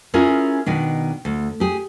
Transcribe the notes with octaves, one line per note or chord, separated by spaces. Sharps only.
C#4 E4 F4 G#4 A#4
B2 D#3 D4
D2
G4 G#4